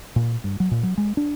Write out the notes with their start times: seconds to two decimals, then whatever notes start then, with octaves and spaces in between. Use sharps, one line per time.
0.16 A#2
0.44 G2
0.60 F#3
0.71 A#2
0.83 F#3
0.98 G#3
1.17 D4